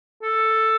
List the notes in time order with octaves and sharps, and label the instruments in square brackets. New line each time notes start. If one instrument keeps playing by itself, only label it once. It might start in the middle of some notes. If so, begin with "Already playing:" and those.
[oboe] A4